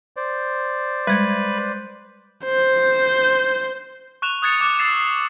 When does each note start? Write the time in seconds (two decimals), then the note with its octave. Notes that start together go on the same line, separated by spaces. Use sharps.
0.17 C5 D5
1.07 G3 G#3 B4 G#6
2.45 C5
4.22 C#6 F#6 E7 F7
4.42 D#6 F#6 G#6 A6 C#7 E7
4.61 D6 F#6
4.79 E6 A6 C7 E7
5.00 C7